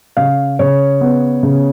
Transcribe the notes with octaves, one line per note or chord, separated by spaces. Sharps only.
C#3 F5
C#3 C#5
B3
C#3